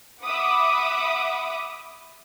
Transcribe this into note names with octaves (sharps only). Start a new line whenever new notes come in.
E5 F#5 B5 D6 D#6